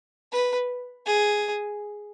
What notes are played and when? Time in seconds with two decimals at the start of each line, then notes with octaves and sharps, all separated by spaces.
0.32 B4
1.06 G#4